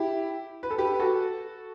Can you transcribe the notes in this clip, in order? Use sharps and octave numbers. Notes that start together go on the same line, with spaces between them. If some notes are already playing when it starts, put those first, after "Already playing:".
Already playing: E4 G4
B4
A4
G4 B4
F#4 A4